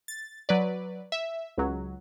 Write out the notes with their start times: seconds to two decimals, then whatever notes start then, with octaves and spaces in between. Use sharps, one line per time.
0.08 A6
0.49 F#3 B4 D5
1.12 E5
1.58 C#2 F#3